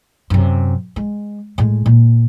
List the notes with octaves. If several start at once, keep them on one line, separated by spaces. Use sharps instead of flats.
F#2 C3
G#3
A2 G#3
A#2